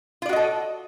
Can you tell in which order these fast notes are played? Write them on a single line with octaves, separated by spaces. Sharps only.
F4 D5 F#4 D#5 A4